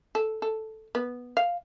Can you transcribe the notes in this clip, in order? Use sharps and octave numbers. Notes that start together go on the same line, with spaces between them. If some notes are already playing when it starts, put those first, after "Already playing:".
A4
A4
B3
F5